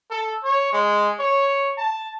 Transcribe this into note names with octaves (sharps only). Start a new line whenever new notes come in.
A4
C#5
G#3
C#5
A5